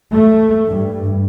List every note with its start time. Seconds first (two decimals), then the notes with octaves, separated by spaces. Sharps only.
0.13 A3
0.67 G2